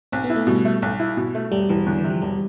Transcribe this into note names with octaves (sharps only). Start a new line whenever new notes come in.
B1 C4
B3
E4
A3
B2 G3
A3
B1
E4
B2
A3
E1 G3
E1 E3
E2 D3
E3
C3 G3
F3
E1 G3